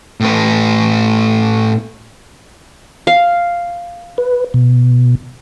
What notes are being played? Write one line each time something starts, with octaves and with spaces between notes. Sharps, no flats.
A2 B4
F5
B4
B2